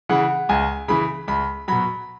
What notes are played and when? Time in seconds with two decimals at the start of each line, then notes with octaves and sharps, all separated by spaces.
0.09 C#3 E3 F#5
0.49 C#2 G#5
0.88 C#3 E3 B5
1.28 C#2 B5
1.68 B2 F#3 B5